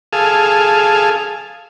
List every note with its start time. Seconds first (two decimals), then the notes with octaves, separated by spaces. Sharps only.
0.13 G#4 A4 F5